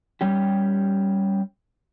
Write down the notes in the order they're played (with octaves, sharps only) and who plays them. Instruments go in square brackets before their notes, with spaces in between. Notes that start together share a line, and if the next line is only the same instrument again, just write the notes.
[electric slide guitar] G3 C#4 G4